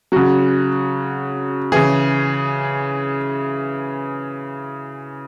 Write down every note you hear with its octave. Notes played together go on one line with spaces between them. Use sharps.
C#3 F#3 F#4
C#3 E3 G#4